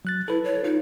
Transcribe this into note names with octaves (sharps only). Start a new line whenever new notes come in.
F#3 F#6 A6
E4 A4 B4
C#5
D#4 F4